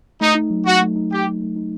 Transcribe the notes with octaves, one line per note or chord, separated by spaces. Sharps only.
A3 D#4
D#4
F#3
F#3 F#4
A3
D#4
F#3 G4
F#3
A3
D#4